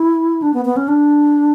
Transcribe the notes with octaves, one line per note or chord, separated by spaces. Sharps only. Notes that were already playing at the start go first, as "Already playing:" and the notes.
Already playing: E4
D4
B3
B3
C#4
D4